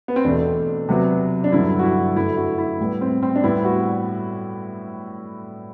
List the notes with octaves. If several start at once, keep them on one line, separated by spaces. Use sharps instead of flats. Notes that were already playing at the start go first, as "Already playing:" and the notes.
B3
C4
E2 B2 A3 D4
C3 F#3 B3
D4
G2 D3 F#3 E4
F#4
E4
F#2 D3 A3 E4
F#4
E4
A2 G3 B3
C4
C4
D4
A2 G3 B3 E4
F#4